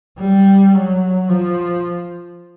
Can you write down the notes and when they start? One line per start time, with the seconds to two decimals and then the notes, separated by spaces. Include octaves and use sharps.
0.19 G3
0.74 F#3
1.29 F3